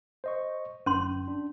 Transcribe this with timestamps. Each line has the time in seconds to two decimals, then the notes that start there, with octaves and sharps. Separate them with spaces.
0.24 C5 D#5 C#6
0.86 G1 F#2 C#4 C6 G6
1.28 D4